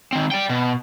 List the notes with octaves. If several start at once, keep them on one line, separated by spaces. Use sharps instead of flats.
D#3 C4
D5 G5
B2